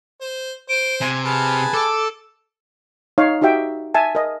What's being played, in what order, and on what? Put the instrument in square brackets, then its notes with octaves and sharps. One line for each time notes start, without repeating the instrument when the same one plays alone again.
[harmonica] C5
[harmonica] C5 [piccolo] D7
[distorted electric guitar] C3 [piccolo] G#5
[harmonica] G#4 B4 A5 [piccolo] F6
[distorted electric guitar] A4 [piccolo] D6
[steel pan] D#4 C#5 F5
D#4 F#4 G4 E5 G5
E5 G#5 A5
A#4 D#5